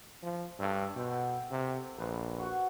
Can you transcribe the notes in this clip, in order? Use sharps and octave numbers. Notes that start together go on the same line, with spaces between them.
F3
G2 A4 C#5 E5
B2 C5 F#5 G5
C3
A#1 B4 C5
F#4 F#5 C#6